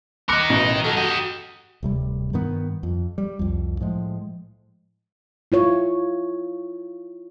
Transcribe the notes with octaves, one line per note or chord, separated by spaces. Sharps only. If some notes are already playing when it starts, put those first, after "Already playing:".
A#4 D#5 D6 F#6 C#7
A1 B2
F#3 A4 A#4
F#4 G4 D#5
D1 C3 G3
G2 D#3 B3
F2
G3
C2 F2
A2 F3 G#3
E4 F4 C#5